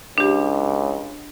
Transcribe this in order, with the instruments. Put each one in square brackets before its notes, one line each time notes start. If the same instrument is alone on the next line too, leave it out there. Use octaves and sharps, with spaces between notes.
[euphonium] C#2 [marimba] D4 G4